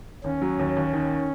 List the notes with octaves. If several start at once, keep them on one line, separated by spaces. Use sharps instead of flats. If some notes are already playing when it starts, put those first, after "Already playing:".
D#2 C#4
F#3
D#2
D#2
D#3